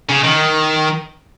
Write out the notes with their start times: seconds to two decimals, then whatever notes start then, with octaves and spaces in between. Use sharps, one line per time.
0.09 C#3
0.24 D#3